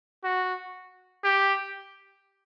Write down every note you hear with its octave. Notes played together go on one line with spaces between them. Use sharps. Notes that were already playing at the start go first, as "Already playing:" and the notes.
F#4
G4